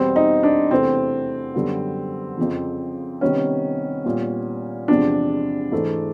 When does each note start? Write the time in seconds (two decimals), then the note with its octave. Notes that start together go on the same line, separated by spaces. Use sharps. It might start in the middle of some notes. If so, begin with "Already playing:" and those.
Already playing: E2 B2 G3 B3 C4
0.16 D#4
0.43 D4
0.71 E2 C3 E3 A3 C4
1.54 F#2 D3 G3 B3
2.38 F2 C#3 F3
3.21 C3 D#3 G3 B3 C#4
4.05 A#2 G3 B3
4.88 E2 C3 F3 G#3 D4
5.72 G#2 E3 A3